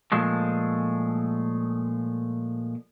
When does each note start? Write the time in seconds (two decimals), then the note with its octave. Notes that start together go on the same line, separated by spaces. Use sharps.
0.12 A#2 F3 G#3 A3